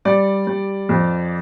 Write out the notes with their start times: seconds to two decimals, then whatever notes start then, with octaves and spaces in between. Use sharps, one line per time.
0.05 G3 D5
0.47 G3
0.89 F2